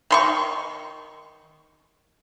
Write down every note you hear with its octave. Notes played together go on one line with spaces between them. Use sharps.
D#3 C6 C#6